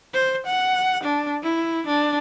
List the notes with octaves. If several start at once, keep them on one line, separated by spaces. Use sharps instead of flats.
C5
F#5
D4
E4
D4